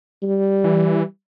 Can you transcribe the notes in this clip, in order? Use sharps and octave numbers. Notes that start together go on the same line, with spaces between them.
G3
E3